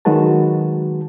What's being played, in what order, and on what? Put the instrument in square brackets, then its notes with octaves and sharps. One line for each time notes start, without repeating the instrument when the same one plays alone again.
[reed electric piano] D#3 F#3 G#3 F#4 B4 A5